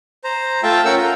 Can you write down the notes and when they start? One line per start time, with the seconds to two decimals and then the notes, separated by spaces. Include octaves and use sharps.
0.24 C5 A#5
0.63 A3 F4 E5 G5 A5
0.85 C#4 A#4 E5 F#5 G5 E6
0.97 F4 A#5